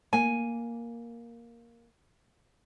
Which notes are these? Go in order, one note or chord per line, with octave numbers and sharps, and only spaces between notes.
A#3 G#5